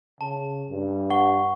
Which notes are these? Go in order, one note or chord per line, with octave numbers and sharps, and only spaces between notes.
C#3 A5
G2
F#5 C#6 G7